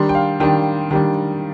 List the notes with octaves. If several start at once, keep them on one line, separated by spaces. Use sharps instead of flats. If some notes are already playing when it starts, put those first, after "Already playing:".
Already playing: D#3 G3 D4 C6
G5
F5
D#3 G3 D4 G5
D#3 G3 D4